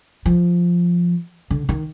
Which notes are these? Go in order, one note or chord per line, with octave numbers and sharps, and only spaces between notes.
F3
D3
D#3